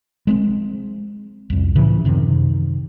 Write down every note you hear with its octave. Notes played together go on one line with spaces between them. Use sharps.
G#3 A#3 C4
C2 F2
A2 C#3 E3 F3
F#2 C3 D#3